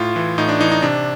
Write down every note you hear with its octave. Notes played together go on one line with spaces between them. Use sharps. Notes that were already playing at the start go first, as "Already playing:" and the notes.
Already playing: A2 F4
E3
A2 D#4
D4
E3 D#4
D#4
C3 D4